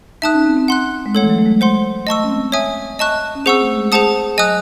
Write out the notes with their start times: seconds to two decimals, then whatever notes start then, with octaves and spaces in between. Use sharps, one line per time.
0.22 D#4 E5 A5 D#6 F#6
0.34 C#4
0.46 C4
0.57 C4
0.68 F#5 C6 F#6
1.06 G#3
1.15 A3 A4 C#5 F#5
1.23 E3
1.30 F#3
1.38 A3
1.46 G#3
1.61 G#3 C5 F#5 C6
2.07 A3 D#5 A5 C#6 E6
2.24 C#4
2.30 C4
2.52 C#5 E5 G#5 D#6
2.99 D#5 A5 C#6 F#6
3.35 C#4
3.45 C4 G#4 C5 F#5 C#6 E6
3.61 A3
3.75 G#3
3.92 G#4 C5 F#5 A5 D#6
4.38 F#3 D#5 G#5 D#6 F#6